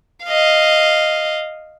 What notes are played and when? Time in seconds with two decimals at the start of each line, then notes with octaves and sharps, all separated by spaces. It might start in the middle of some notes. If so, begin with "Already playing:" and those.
0.25 D#5 F5